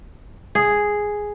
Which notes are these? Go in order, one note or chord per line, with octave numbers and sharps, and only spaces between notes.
G#4